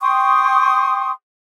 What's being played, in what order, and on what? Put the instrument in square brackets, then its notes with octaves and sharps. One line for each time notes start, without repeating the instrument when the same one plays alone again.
[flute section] G5 C6 C#6 D#6